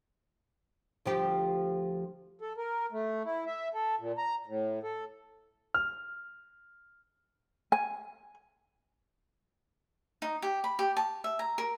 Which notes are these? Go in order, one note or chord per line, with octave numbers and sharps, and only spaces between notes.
D2 F3 G4
A4
A#4
A3
E4
E5
A4
A#2
A#5
A2
A4
F6
G#5
D#4
G4
B5
G4
A5
E5
A#5
A#4